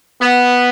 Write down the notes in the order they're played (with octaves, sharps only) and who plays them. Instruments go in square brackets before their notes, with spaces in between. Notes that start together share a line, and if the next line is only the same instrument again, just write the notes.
[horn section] B3